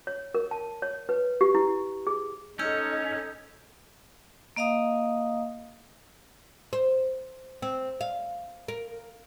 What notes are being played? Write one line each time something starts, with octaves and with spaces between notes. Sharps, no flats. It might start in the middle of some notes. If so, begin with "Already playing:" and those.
C#5
A#4
A5
C#5
B4
G4
E4
G#4
C#4 D#4 A4 D#5 E6 G6
A#3 D#5 F5 A#5 D#6
C5
C4
F5
A#4